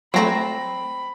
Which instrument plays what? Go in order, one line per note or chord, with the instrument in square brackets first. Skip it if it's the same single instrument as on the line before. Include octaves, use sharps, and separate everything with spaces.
[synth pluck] F#3 A3 [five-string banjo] C4 A#5 [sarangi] B5